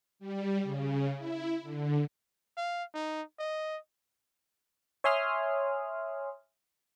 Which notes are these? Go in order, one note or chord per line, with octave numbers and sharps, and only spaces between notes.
G3
C#3
E4
D3
F5
D#4
D#5
C#5 E5 G#5 C6 D#6 F6